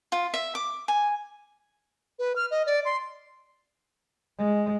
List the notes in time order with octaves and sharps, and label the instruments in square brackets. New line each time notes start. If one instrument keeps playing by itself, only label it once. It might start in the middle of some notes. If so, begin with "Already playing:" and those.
[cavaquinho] F4
E5
D6
G#5
[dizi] B4
F6
D#5
D5
C6
[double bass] G#3